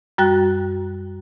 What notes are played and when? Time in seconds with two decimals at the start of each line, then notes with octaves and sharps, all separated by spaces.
0.18 F#2 G3 F#4 G5 F#6